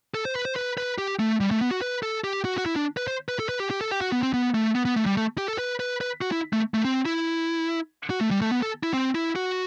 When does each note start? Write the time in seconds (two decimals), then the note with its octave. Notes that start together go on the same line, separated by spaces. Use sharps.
0.14 A4
0.25 C5
0.35 B4
0.45 C5
0.56 B4
0.78 B4
0.98 G4
1.19 A3
1.40 G3
1.51 A3
1.61 B3
1.71 F#4
1.81 B4
2.03 A4
2.24 G4
2.45 F#4
2.58 F#4
2.66 E4
2.76 D4
2.97 B4
3.08 C5
3.29 B4
3.40 A4
3.49 B4
3.60 G4
3.71 G4
3.81 A4
3.91 G4
4.01 F#4
4.12 B3
4.23 C4
4.34 B3
4.54 A3
4.75 B3
4.85 B3
4.96 A3
5.06 G3
5.17 A3
5.38 G4
5.48 A4
5.58 B4
5.80 B4
6.01 B4
6.21 F#4
6.32 E4
6.53 A3
6.74 A3
6.85 C4
7.06 E4
8.10 F#4
8.21 A3
8.31 G3
8.41 A3
8.51 B3
8.62 A4
8.83 E4
8.94 C4
9.15 E4
9.36 F#4